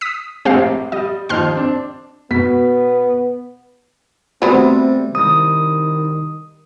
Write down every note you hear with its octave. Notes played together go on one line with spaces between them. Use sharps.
D#6 B6
A#1 A2 C4 G4 F5
G3 D#5
D#2 F3 D#4 C6 F6
C4 D4
B2 B3 B6
C3 F#3 G3 A3 B3 C4 C5
C2 D#3 D#6